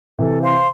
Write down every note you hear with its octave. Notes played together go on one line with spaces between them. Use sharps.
C3 E3 A4
C5 F5 C6